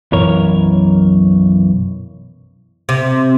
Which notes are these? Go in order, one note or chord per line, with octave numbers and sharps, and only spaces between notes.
B1 F#2 E3 A#4 C#5
C3